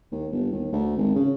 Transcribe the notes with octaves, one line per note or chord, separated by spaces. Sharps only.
D#2
G1
D#2
D2
G#1
C#3